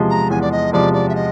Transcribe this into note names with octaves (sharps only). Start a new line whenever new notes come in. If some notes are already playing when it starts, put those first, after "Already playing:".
Already playing: E2 C3 F3 G#3
A#5
E2 G#5
D5
D#5
C3 F3 G#3 D5
D5
E5
D#5